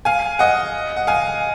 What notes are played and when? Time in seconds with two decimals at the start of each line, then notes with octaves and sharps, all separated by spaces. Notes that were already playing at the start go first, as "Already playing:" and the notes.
0.05 F5 G#5
0.39 D#5 F#5
0.96 F#5
1.07 F5 G#5